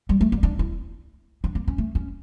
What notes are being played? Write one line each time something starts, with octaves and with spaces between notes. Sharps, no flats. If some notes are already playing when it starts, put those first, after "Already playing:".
G3
A3
A#3
D4
E4
D4
A#3
C#4
A3
C#4